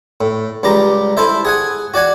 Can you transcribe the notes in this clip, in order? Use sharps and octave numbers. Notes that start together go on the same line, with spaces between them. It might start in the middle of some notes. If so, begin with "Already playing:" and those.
A2
C#2 G3 G4 A#5
E4 A4 C5 E5
G#4 F#5 G#5
F#4 D5 F#5 G#5